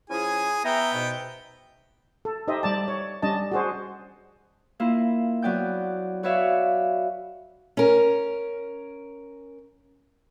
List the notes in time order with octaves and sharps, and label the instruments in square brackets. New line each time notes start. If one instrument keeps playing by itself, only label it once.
[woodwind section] F3 C#4 E4 [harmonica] G#4 G#5
[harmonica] B3 G5 [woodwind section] E5 A#5
[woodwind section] G#2 B2
[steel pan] A4
D#4 G4 C5 D#5 E5
G3 D5 A5
C#5
G3 C#4 D4 D#5 A5
F#4 G#4 C5
[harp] A#3 E4 F4
F#3 B3 D5 G5 G6
F#4 B4 C#5 D5 E5 F5
[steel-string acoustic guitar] C#4 A#4